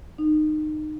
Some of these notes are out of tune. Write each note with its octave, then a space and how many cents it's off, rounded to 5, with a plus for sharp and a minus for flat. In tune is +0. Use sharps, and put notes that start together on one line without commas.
D#4 -25